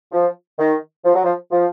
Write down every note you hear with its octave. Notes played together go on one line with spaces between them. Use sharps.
F3
D#3
F3
F#3
F3
F3